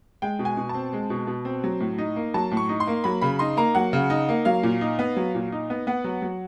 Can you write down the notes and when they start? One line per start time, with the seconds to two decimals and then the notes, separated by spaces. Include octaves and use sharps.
0.22 G#3 G5
0.39 B2
0.45 G#5
0.57 B2
0.69 A5
0.74 C4
0.93 G#3
1.10 B2
1.27 B2
1.45 C4
1.64 F#3
1.80 A2
1.98 D#4
2.16 A#3
2.34 F#3 A5
2.51 A2
2.57 C#6
2.69 D#4
2.80 C6
2.87 A#3
3.04 F#3 B5
3.21 C#3 B5
3.39 D#4 C6
3.57 A#3 A#5
3.75 F#3 F#5
3.93 C#3
4.10 D#4
4.29 A#3
4.45 F#3 F5
4.63 A#2
4.81 D#4
4.99 B3
5.16 F#3
5.35 A#2
5.52 D#4
5.70 B3
5.87 B3 F#5
6.04 F#3
6.22 F#3